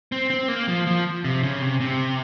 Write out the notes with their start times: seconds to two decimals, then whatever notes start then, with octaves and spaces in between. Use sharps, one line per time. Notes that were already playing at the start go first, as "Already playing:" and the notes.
0.12 C4
0.30 C4
0.48 A#3
0.68 F3
0.87 F3
1.25 C3
1.43 C#3
1.62 C3
1.80 C3